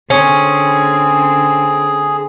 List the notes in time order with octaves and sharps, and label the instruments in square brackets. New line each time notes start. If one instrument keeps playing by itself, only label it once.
[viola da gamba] D3 C4 [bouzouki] C#4 [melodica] G#4